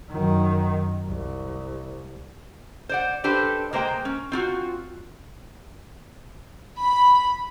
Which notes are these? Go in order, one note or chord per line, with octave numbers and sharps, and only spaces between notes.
F#2 D#3
C2
C5 D5 F#5
D4 G4 A4 B4 C5
G#3 A#3 C5 D5 G5
C#4
C4 F4 F#4
B5